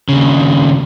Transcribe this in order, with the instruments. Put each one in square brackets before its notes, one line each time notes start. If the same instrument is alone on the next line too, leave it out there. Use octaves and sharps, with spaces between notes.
[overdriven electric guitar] D#2 C#3